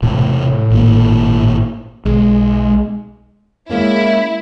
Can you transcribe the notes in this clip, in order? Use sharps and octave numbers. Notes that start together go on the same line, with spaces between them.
E1 A2 C3 A3
G#1 A#2 A#3
B1 G#3
G#3 A#3 C#4 E4